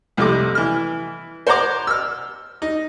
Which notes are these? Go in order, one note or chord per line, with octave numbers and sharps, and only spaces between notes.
C2 F2 C3 A3 D#5 D6
E3 F6
C5 C#5 F#5 A#5 D6
E6 F6
D#4